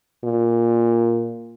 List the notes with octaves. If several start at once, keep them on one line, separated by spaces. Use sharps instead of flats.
A#2